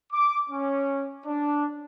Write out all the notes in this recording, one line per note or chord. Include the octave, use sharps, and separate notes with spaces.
D6
C#4
D4